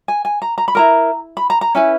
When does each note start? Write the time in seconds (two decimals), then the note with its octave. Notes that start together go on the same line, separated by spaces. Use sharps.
0.08 G#5
0.25 G#5
0.42 A#5
0.58 A#5
0.68 B5
0.75 E4 A#4 A#5
1.37 B5
1.50 A#5
1.61 A#5
1.75 C#4 E4 B4 G#5